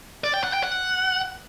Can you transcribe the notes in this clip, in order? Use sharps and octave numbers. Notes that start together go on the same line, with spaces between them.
D5
G5
F#5
G5
F#5